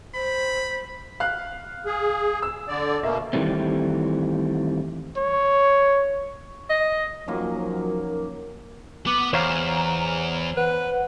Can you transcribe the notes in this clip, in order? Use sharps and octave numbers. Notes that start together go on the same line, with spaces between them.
C5 B5
F5 F#6
G#4
E6
D3 D5
B2 A#3 E5
D#3 E3 G3 A3 C4
C#5
D#5
F#2 D#3 F3 F#3 A#3
B3 D6
E2 C5 C#5 F5 A#5
B4 F#5